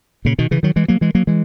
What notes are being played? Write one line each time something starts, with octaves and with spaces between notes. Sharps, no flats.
A#2 C#3
B2 D#3
C#3 E3
D#3 F#3
E3 G#3
F#3 A#3
E3 G#3
F#3 A#3
E3 G#3